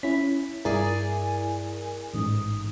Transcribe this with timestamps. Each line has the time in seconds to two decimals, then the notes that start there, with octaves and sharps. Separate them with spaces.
0.03 C#4 E4 B6
0.65 G2 E4 G#4 A#4 D5 G#5
2.14 A1 G#2 D#6